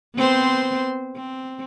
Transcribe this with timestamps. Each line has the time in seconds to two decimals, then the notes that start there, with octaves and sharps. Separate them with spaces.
0.16 B3 C4 C5
1.16 C4